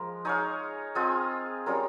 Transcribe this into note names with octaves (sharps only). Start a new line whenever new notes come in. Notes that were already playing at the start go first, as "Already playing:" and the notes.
Already playing: F3 G#3 A#4
D#4 G#4 C#5 F5
C4 F4 G#4 D#5
G3 C#4 F4 A#4